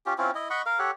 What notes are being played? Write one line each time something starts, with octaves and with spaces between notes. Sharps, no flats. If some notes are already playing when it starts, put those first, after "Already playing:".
C#4 F4 G4
C4 C#4 E4 F4
E4 D#5
D#5 F#5 B5 C#6
A#4 F5
G4 A4 C#5 F#5